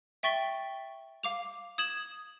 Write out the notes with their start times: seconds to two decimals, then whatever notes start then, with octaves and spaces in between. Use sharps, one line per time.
0.23 E5 G5 C#6 A6 B6 G7
1.23 F5 D6 F7
1.78 D#6 G#6 E7 F#7